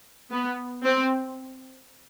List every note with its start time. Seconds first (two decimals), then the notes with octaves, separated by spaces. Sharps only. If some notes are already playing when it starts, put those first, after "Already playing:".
0.31 B3
0.84 C4